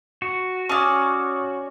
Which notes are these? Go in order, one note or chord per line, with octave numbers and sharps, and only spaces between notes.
F#4
C#4 D5 C#6 D#6 F6